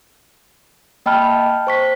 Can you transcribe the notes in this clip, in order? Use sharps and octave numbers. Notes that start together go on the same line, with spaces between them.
A#3 D#5 G5 A5 B5 F6
C5 C#6 B6